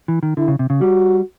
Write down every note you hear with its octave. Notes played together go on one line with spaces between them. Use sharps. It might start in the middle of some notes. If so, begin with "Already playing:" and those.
E3
D#3
D3 E4
C#3
C3
C#3
G3 F#4